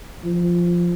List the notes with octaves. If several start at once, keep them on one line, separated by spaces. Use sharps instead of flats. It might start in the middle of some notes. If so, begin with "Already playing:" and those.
F3